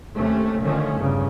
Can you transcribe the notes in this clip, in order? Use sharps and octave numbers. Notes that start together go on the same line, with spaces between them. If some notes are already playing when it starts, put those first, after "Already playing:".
D#2 C3 A3 C#4
D3 D#3 F3 A3 C#4
E2 G2 C#3